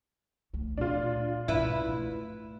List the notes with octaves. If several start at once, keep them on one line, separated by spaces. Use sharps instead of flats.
D2 A3
A#2 D4 F4
B1 G#2 E4 B4
A3